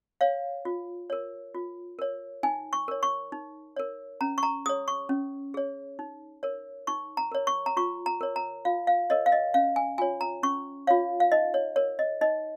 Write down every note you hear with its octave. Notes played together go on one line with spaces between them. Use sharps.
C#5 F5
F4
A#4 C#5
F4
A#4 C#5
D#4 G#5
C#6
A#4 C#5
C#6
D#4
A#4 C#5
C#4 A#5
C#6
A#5
G#4 C#5 D#6
C#6
C#4
G#4 C#5
D#4
A#4 C#5
D#4 C#6
A#5
A#4 C#5
C#6
A#5
F4 C#6
A#5
A#4 C#5
A#5
F4 F5
F5
A#4 C#5 D#5
F5
D#5
C#4 F5
G#5
F4 C#5 G#5
A#5
C#4 C#6
F4 C#5 F5
F5
D#4 D#5
C#5
A#4 C#5
D#5
D#4 D#5